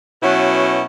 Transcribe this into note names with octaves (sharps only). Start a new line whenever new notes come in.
B2 F#3 B3 C#4 E4